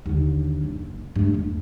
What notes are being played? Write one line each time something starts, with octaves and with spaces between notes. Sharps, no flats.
D#2 D3
F#1
G2 A3
E2